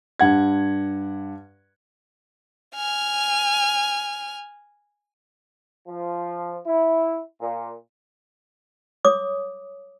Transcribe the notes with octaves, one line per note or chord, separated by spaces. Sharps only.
G2 F#5 G#6
G#5 F6
F3
E4
A#2
C#5 D6 D#6